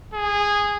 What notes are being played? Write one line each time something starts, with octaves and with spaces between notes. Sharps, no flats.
G#4